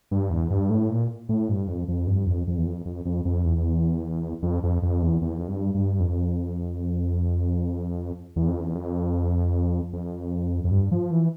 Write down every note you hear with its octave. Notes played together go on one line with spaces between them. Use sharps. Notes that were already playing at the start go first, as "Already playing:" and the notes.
G2
E2
G2
A2
A#2
A2
G2
F2
F2
G2
F2
F2
E2
F2
F2
F2
F2
E2
F2
F2
F2
E2
E2
F2
G2
G2
F2
E2
F2
E2
F2
F2
F2
G2
F3
E3